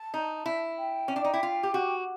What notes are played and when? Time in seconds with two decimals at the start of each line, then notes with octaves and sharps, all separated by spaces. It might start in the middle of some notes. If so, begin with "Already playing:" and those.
Already playing: A5
0.14 D#4
0.46 E4
0.77 G5
1.08 C#4
1.16 D4
1.24 D#4
1.33 E4
1.43 F4
1.63 G4
1.74 F#4